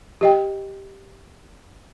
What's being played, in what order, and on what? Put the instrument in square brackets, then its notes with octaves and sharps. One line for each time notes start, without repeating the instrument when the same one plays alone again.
[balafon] G4 D#5 G5